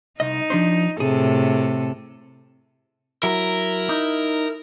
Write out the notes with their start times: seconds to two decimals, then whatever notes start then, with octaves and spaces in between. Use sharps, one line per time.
0.20 C2 D#4 D#5
0.50 F3 D4 C5
1.00 A2 C3 G#4 A4
3.23 F#3 E4 A#4
3.89 D#4